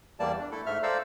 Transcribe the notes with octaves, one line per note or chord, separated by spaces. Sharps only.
E2 E3 G3 A#3 D5 A5
D4
A3 E4 A4
G#2 A3 E5 F6
A4 C5 D5 F5 A#5 E6